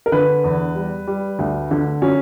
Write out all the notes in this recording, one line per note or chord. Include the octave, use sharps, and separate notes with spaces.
A#4
D3 B4
E2
G3
G3
D2
D3
F#3 C#4